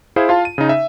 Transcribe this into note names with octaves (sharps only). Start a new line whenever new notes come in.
E4 G#4 C5 F5
F4 F5 A5
D#7
C#3 D#4
E5